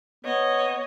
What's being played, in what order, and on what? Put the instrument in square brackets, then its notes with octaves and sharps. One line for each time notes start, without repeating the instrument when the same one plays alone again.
[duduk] B3 [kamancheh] C#5 D#5